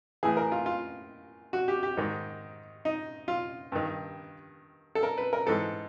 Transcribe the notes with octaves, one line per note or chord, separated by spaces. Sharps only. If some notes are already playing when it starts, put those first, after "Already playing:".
A2 E3 G#4
A#4
F4
F4
F#4
G4
G4
G#2 D#3
D#4
F4
G2 D#3
A4
A#4
B4
A#4
G#2 E3 A4